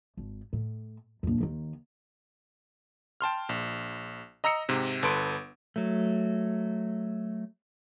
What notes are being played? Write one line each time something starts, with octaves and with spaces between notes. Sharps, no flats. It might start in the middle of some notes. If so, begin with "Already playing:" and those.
G#1
A2
A#1 F2
D#2 D#3
G5 A5 C6 F6
A#1
D#5 A#5 E6 A#6 C#7
G#2 C3
G1 A4 B4 C6 D7
F#3 A3